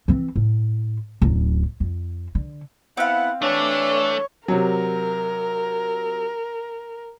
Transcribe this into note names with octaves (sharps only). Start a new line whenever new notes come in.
E3 C4
A2
D1 F#2
F2
D3
B3 C4 E4 F5 F#5
E3 A3 D4 C#5
C3 F#3 A#4